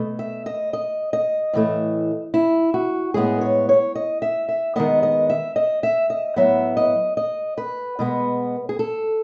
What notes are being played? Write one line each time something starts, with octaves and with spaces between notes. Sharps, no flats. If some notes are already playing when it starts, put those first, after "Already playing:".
Already playing: B2 A3
E5
D#5
D#5
D#5
A2 E3 A3
E4
F#4
A2 G#3 B3 G#4
C#5
C#5
D#5
E5
E5
D#3 G#3 B3 D#5
D#5
E5
D#5
E5
D#5
A2 F#3 B3 E5
D#5
D#5
B4
B2 G#3 B3
G#4
A4